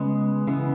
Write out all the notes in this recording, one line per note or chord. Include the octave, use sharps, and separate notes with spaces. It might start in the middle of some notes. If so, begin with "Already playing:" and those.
Already playing: C#3 G#3 B3
C#3 E3 B3